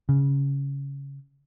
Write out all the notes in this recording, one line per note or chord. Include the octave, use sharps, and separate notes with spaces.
C#3